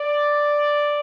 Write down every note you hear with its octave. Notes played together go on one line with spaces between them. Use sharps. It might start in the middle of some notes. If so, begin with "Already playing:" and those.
Already playing: D5